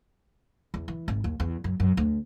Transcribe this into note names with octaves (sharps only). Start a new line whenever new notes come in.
E2
E3
G#1
D#2
E2
F#2
F#2
D2